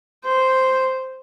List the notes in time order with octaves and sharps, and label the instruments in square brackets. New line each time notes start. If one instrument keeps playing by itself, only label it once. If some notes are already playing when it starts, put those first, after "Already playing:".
[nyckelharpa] C5